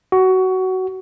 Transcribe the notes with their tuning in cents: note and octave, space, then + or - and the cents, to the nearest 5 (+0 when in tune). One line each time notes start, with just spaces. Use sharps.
F#4 +20